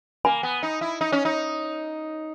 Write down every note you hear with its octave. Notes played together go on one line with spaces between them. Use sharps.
A#3 G#5 B5
B3
D#4
E4
D#4
C#4
D#4